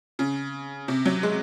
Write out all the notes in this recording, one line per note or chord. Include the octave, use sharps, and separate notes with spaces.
C#3
C3
F#3
G#3